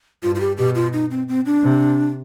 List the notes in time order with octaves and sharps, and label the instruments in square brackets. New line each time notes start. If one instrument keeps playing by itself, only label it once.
[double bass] G2 [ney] F4
[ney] F4
G4
[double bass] B2 [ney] G4
[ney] F4
D#4
C4
C4
D4
[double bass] C3